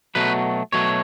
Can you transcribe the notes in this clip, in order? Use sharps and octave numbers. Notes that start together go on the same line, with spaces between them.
B2 F#3 A3 B4
B2 F#3 A3 C#5